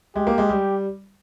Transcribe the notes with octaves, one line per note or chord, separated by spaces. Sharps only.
G#3 G4
A#3
G#3
G3